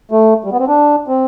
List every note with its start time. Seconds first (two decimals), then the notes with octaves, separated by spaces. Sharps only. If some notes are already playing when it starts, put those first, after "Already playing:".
0.11 A3
0.44 G3
0.52 B3
0.60 C4
0.68 D4
1.08 C4